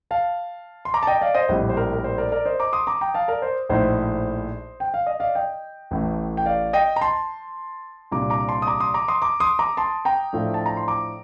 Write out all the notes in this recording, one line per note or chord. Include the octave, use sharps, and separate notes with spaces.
F5 A5
C6
A#5 D6
A5
D#5 G5
D5 F5
C5 D#5
A#1 A2 G3 C4
C5
A#4
A#4
C5
A#4 D5
A#4 D5
C5 D#5
A#5 D6
C6 D#6
A#5 D6
G5 A#5
F5 A5
A#4 D5
C5
A#1 A2 A3 D#4 C5 D#5
G5
F5
D#5
D5 F5
D#5 G5
A1 A2 A3
G5
D5 F5
D#5 G5
A#5
A5 C6
C2 A#2 G3 D4 A#5 D6
A#5 D6
A5 C6
D#6
A#5 D6
C6 D#6
A#5 D6
C6 D#6
A#5 D6
C6 D#6
A#5 D6
A5 C6
G5 A#5
A2 F3 A3 D4
A5
A#5
C6
A#5 D6